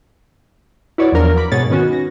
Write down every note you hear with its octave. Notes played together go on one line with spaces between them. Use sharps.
E4 F#4 B4 C#5 D5
E2 F3 F#3 D4 A#4
B5 D6
G#2 B2 G#4 B4 C#5 A6
D#3 B3 C#4 F#4
A#6